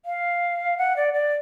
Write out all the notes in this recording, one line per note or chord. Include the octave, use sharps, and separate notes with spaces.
F5
F#5
D5
D5